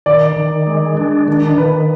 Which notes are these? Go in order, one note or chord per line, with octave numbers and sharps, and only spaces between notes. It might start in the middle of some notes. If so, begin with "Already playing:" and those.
D#3 D5
D#3
G#3
D4
D#3
D#3 B4